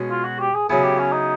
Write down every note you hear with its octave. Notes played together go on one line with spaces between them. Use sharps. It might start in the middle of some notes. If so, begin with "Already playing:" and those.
Already playing: B2 G#3 C#4
F4
F#4
G4
G#4
C#3 F#3 B3 E4 G#4
G4
C#4
D#4